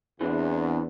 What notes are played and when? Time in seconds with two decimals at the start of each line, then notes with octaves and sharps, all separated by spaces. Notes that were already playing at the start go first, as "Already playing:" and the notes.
0.21 E2 E3 C4 D4